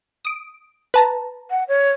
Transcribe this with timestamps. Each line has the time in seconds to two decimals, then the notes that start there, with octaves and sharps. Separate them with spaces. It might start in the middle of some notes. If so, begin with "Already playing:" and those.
0.25 D#6 D7
0.94 B4 A5 A#5
1.50 F#5
1.68 C#5